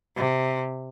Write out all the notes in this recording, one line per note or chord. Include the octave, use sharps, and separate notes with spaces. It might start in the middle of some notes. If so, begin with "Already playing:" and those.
C3